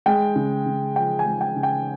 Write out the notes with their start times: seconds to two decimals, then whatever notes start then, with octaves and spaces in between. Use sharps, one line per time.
0.06 G#3 G5
0.36 C#3
0.66 C#3
0.96 F3 G5
1.19 G#5
1.26 G#3
1.41 G5
1.56 C#3
1.63 G5